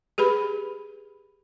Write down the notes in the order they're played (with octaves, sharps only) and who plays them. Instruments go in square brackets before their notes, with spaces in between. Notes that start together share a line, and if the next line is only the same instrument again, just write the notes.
[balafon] G4 G#4 B4 B5